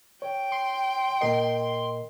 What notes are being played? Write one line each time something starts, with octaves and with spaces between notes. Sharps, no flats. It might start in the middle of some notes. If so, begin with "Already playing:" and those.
C#5 G5
C6
A#2 A#4 D#5 C6